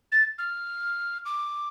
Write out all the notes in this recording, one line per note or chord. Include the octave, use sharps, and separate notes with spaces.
A6
F6
D6